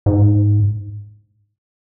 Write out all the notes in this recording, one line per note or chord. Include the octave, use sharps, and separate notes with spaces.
G#2